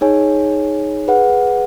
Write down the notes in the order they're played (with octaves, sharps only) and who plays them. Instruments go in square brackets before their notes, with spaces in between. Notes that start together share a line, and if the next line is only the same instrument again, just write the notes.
[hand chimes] D#4 G#4 C#5 G#5
G#4 B4 F#5